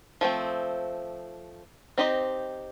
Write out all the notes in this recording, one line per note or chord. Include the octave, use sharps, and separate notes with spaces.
F3 A3 C4
C4 D#4 G4 C5 D#5